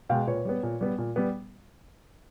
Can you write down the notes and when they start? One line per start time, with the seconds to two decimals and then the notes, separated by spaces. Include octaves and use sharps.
0.09 B2 G#3 F5 G5
0.27 A#2 B4 C#5
0.45 G3 B3
0.63 A#2
0.81 G3 B3
0.98 A#2
1.16 G3 B3